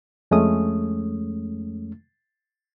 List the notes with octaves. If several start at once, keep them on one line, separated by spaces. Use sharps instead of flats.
F2 G#3 A3 C#4 D#6